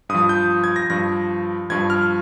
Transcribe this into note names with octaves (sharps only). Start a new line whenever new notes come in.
G2 D#6
F3
G6
G#6
A#6
G2 F3 A#6
G2 F3 G#6
F6